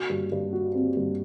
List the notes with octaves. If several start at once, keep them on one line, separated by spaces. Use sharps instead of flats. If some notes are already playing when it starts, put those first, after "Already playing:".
Already playing: F#4
G2
G2
F#4
C4
G2